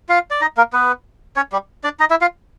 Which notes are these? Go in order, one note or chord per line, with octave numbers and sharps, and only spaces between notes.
F4 F5
D5
D#4 D#5
A#3 A#4
B3 B4
C#4 C#5
G3 G4
D4 D5
D#4 D#5
E4 E5
F4 F5